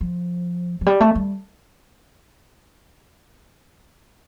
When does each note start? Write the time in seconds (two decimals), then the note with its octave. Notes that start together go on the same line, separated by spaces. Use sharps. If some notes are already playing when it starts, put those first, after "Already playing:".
0.01 F3
0.81 F3
0.86 G3
1.00 A3
1.15 G3